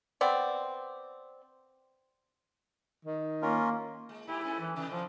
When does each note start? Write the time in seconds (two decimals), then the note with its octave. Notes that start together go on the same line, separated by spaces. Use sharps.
0.21 B3 C4 D5
3.05 D#3
3.42 A#3 C#4 F4 A#4
4.09 G#3
4.27 G2 A3 E4 G4
4.42 G2 C#4 A4
4.60 E3
4.76 A2 C3 D#3 E3
4.91 F3